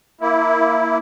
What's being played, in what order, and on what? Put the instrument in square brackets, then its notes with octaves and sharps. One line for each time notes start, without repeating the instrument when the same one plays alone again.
[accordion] A#3 E4